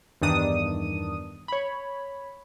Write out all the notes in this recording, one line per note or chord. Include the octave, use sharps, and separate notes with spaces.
E2 G2 D#3 D4 D#6 D#7
C#5 B5